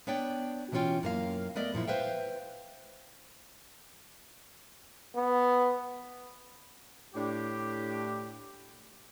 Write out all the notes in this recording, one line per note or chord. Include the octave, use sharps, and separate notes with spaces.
B3 D4 C#5 D5 G5
B2 E3 A#3 C#4 F4 G5
F#2 A#3 F5
A3 B3 A#4 D5 D#5
F#2 A#2 F3 E4
B4 C5 E5 F5 G5
B3
A2 D4 G4